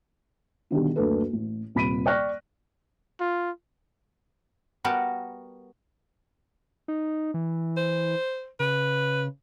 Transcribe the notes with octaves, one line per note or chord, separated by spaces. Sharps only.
B2 D3 D#3 G3
F#1 D2 D4 A4 B4
A1
D#1 C3 B5 B6 D7 D#7
D5 G5 C#6 F6 F#6 A#6
F4
G3 B3 F#4 A#4 A5
D#4
E3
C5
C#3 B4